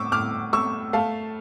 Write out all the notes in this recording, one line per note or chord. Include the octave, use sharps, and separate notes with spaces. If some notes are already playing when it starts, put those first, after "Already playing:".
Already playing: A2 C#6 D6 E6
A2 D6 F6
A3 C#6 E6
A3 F5 A5